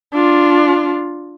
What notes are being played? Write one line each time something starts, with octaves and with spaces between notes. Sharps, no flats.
D4 F4